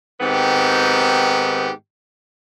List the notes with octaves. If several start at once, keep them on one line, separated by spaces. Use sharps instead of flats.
G#2 D#3 B3 C4 G4